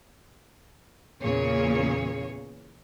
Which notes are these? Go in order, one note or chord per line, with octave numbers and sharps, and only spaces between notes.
E2 A#2 C#3 A#3 G#4 C#5